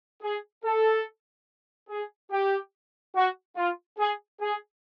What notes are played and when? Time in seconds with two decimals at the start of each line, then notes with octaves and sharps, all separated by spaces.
0.22 G#4
0.65 A4
1.89 G#4
2.31 G4
3.15 F#4
3.57 F4
3.98 G#4
4.41 G#4